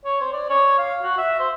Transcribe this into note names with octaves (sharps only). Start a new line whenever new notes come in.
C#5
C5
D5
C#5
F5
F#4
E5
C5